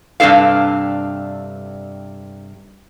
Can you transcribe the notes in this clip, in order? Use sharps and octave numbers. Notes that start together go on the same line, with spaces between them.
G2 C3 D4 A4 F5